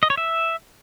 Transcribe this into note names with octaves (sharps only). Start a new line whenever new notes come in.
D#5
C#5
E5